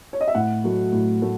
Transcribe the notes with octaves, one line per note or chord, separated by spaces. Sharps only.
C#5
D#5
E5
A2 F#5
F#3 A3
A2
F#3 A3